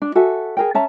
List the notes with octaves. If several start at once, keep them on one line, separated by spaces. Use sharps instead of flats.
D4
F#4 A4 E5 G#5
G#4 A#4 G5
C#4 E5 A5 A#5